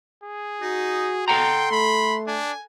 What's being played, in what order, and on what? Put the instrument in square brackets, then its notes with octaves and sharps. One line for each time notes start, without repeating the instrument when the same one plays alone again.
[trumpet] G#4
[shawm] D#4 [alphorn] F#4
[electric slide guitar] A4 F#5 A#5 [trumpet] G5 [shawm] C6
[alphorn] A3 [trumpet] B5
[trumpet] D4 [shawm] G#5